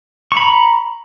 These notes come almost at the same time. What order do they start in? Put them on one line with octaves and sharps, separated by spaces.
C#6 B5 A#5